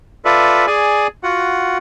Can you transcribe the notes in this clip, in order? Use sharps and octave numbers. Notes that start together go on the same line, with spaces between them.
F4 A4 B4 D5 E5
G#4 D5 G#5
F4 F#4 F#5